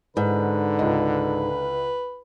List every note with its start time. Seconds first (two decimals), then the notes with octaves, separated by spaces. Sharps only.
0.17 G#2 D3 B4
0.79 C#2 D#5